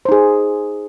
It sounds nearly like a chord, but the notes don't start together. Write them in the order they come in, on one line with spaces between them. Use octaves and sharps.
C5 D#4 G#4